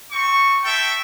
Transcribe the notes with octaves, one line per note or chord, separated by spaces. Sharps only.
C4 C#6
A4 E5 G5